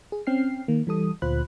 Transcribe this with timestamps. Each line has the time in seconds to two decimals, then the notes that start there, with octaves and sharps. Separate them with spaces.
0.12 G#4
0.27 C4 C#4 G5 F6 C7
0.68 D#3 A#3
0.87 E3 G3 A4 D#6
1.22 D2 A#2 F4 C5 B5 F#6